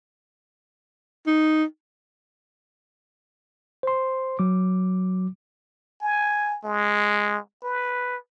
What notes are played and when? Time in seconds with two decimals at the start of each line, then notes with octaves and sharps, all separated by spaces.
1.27 D#4
3.83 C5 C6
4.39 F#3 D6
6.01 G#5
6.64 G#3
7.63 B4